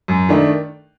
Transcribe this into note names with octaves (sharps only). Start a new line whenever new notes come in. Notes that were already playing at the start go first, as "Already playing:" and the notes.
F#2
D#3 A3 D4